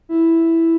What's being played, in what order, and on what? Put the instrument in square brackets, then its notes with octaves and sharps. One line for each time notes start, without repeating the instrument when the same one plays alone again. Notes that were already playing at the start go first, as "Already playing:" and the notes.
[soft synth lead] E4